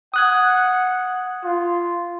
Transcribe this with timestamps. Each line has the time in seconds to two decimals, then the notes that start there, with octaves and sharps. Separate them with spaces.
0.14 F#5 D#6 F#6 G#6
1.44 F4